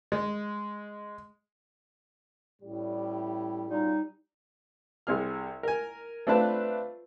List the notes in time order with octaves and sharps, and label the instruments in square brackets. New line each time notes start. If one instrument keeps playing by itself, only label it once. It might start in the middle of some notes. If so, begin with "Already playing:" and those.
[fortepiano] G#3
[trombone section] A1 G3 [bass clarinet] A2
[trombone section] B2 C#4 F4 [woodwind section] G3 D#4
[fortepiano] C2 C3 G#4 F6
A#4 G#5
A3 C4 D4 F4 B4 A5